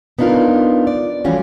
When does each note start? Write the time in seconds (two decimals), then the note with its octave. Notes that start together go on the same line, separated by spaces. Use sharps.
0.19 B3 D4 D#4 F4 A#4
0.87 D5
1.24 E3 G3 A3 C#4 F4 F#4